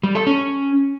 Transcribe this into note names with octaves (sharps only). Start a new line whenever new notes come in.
G3
A4
C#4